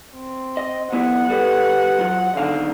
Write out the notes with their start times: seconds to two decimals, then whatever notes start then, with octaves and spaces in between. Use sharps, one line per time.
0.15 C4
0.57 D#5
0.92 G2 B3 E4 F#5
1.29 G3 A4 B4
1.99 F#3 F4
2.37 B1 D3 D#3 F5